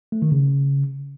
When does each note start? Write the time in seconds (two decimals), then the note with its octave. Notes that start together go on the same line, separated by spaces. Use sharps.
0.12 A3
0.22 D#3
0.32 C#3